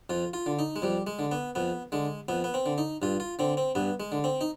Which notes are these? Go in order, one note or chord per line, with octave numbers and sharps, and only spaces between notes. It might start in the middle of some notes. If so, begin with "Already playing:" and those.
F2 F4
F4
D3
D#4
G#3
F2 G3
G#3
D3
B3
F2 B3
D3 G#3
F2 B3
B3
C4
D3
D#4
G2 F4
F4
D3 C4
C4
G2 B3
G#3
D3
C4
D#4